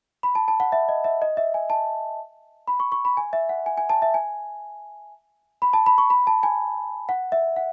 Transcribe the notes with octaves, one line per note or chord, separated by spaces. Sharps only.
B5
A5
A5
F#5
E5
D#5
E5
D#5
E5
G#5
A5
B5
C#6
C#6
B5
G#5
E5
F#5
G#5
G#5
A5
E5
G#5
B5
A5
B5
C#6
B5
A5
G#5
F#5
E5
F#5